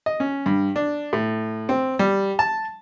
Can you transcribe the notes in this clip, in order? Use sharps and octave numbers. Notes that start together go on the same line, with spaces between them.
D#5
C#4
G2
D4
A2
C4
G3
A5